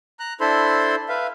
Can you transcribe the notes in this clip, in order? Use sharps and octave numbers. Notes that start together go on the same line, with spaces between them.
A#5 F#6
D4 E4 A4 C5 B5 C6
B4 E5 F5